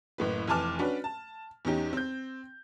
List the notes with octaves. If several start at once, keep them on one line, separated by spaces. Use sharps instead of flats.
F#1 A2 B4
F1 E3 G#5 A5 D6 F6
C#4 D4 F#4 B4
A5
E2 C#4 D#4 G4
C4 G6